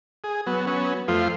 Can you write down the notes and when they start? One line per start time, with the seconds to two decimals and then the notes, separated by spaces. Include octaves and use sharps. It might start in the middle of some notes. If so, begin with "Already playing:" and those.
0.24 G#4
0.46 F#3 B3
0.67 F#3 B3 C#4
1.08 F2 F3 A3 F4 C6